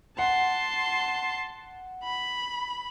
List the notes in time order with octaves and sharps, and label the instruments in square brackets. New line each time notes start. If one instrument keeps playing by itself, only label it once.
[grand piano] F#5 [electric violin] A5 C6
[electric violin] B5